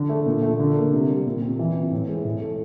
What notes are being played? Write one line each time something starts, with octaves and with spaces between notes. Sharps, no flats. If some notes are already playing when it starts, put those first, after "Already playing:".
Already playing: D3
A3
A#2
A3
D3
A#3
C3
G3
A#2
C4
E3
C4
A2
G#3
A2
A3